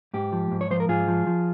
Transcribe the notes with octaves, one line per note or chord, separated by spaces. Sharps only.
G#2 G4
F3
G#2
C#5
F3 C5
A#4
G#2 F4 G#4
F3
F3